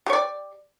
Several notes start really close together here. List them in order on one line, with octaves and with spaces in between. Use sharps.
G4 C#5 D5